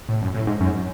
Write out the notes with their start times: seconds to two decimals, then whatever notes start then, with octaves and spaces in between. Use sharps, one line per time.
0.09 A2
0.22 F#2
0.35 A2
0.47 G#2
0.60 F#2